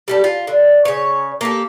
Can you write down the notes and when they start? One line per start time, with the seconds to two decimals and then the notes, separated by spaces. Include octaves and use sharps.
0.08 G3 G4 A4
0.24 F4
0.47 D3
0.85 C#3 C#5
1.41 A#3 G4 A4